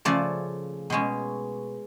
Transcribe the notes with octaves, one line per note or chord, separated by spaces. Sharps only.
C#3 F3 A3 D5
B2 G#3 C#4